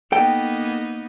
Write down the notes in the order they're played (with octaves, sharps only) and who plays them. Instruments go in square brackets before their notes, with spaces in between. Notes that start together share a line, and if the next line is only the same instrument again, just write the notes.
[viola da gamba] A#3 B3 D#4 [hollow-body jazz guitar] A4 G5